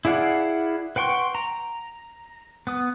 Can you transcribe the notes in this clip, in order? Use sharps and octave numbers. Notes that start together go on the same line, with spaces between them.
E4 G#4 D5 F5 F#5
B4 F#5 G5 C6 C#6
A#5
B3 D#6